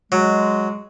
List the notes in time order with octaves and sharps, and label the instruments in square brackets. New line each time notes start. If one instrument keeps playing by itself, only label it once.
[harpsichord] F#3 [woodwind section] G#3